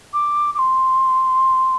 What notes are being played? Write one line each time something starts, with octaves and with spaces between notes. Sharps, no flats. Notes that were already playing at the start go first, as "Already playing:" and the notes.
D6
D6
C6